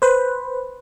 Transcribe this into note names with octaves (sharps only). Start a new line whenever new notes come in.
B4 C5